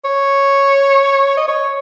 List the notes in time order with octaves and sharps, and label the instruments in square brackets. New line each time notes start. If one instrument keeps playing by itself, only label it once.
[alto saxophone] C#5
D#5
C#5